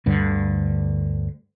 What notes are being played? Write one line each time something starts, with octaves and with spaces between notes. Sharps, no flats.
D2 G2 D3